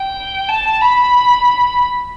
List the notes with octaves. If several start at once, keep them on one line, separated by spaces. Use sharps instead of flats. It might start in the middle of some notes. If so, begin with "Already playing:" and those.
Already playing: G5
A5
B5